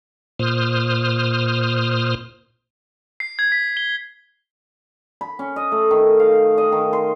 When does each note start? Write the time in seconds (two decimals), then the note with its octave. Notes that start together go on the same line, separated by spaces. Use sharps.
0.39 A#2 C5 D#6 F6
3.20 C7
3.39 G#6
3.52 B6
3.77 G7
5.21 B5
5.39 C#4
5.56 D#5
5.72 A3
5.91 D#3
6.20 F5
6.58 D#5
6.72 D#3
6.93 C6